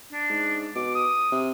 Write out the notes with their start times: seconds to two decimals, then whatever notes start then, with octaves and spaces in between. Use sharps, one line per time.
0.12 D4
0.30 G#2
0.76 B2 D6
0.95 D#6
1.32 C3